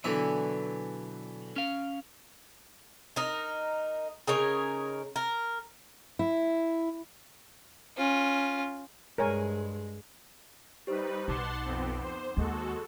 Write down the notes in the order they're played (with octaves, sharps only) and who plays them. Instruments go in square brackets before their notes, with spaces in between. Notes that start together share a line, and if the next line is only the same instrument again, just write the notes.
[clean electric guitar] B2 F#3 B3 [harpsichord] D3 E3 E5
[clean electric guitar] C#4 F5
[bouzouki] D#4 A#4
C#3 D#4 A#4 C#5
A#4
[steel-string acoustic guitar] E4
[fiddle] C#4 F4
[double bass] G2 G#3 [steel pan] A#4 C#5 G#5
[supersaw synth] G3 D#4 B4 [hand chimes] G4 C5
[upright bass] B1 [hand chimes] D#4 D6 [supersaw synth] F#5 A5 C6
[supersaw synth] F2 B3 C4
C5
[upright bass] D#2 [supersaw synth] G#3 F#4 A4